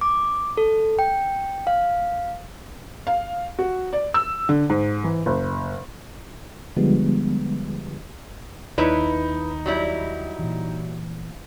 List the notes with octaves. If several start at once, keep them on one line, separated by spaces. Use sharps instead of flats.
D6
A4
G5
F5
F5
F#4
D5
E6
D3
G#2
E3
F#1
D3 F3 G3 G#3 B3
D#2 D#4 E4 B4 C#5
F#3 G3 E4
A#2 E3